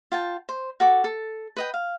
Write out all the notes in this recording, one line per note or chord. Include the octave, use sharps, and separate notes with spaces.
F4 G5 A5
C5
F#4 A4 D6
A4
B4 D#5 G5
F5